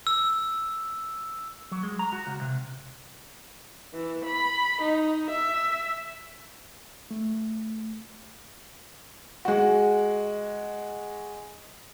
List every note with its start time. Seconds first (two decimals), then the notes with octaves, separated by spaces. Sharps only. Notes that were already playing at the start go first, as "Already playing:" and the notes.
0.07 E6
1.71 F#3
1.83 G#3
1.99 A#5
2.13 F#4
2.27 C#2
2.41 C3
3.93 E3
4.25 B5
4.81 D#4
5.30 E5
7.11 A3
9.45 G#3 F#4